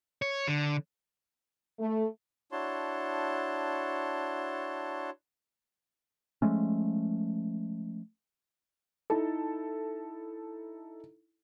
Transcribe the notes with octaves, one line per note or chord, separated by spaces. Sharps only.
C#5
D3
A3
D4 E4 F#4 C#5 A5 C6
F3 G#3 A3 C#4
D#4 E4 A4